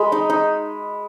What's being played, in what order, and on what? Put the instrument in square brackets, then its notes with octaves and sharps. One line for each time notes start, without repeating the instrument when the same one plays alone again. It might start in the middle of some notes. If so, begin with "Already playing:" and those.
Already playing: [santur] G#3 B5
D#4
D#4